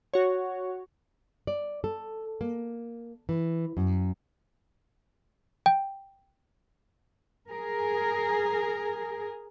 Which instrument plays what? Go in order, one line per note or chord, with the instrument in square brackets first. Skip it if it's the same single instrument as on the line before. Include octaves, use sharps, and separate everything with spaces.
[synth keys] F#4 C#5
[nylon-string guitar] D5
A4
A#3
E3
F#2
[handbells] G5
[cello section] G#4 A#4